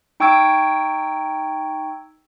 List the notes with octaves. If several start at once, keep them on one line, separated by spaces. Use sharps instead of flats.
D#4 G5 C#6 E6 G#6 D7